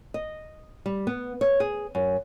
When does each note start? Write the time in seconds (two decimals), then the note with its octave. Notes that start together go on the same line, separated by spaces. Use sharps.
0.14 D#5
0.86 G3
1.07 B3
1.41 C#5
1.60 G#4
1.95 F#2